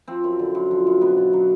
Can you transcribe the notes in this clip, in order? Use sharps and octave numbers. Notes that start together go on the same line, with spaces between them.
F3 C4
F#2
D3
F#2
F3
F#2
B2 B3
B2
F#3